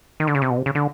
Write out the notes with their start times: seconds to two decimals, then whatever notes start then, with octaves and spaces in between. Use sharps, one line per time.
0.20 D#3
0.27 D3
0.35 C#3
0.42 C3
0.50 B2
0.58 C3
0.66 C#3
0.75 D3